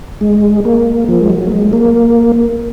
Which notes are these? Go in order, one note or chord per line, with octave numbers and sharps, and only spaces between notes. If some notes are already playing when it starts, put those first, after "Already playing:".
G#3
A#3
F3
G#3
F#3
A#3
G#3
A#3